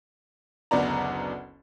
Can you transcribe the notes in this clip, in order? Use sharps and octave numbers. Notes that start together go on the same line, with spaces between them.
F#1 D2 B3 D5 A#5